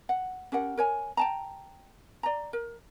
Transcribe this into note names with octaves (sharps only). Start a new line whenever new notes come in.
F#5
C#4 G4 A#4 F#5
A#4 C#5 G#5
G5 A5 A#5
D5 A#5
A#4